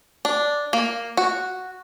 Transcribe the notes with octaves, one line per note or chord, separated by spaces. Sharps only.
D4
A#3
F#4